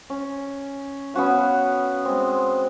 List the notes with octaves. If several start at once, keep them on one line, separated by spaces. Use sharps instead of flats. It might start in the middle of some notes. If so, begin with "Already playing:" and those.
C#4
B3 C#4 F#4 F5
G#3 C4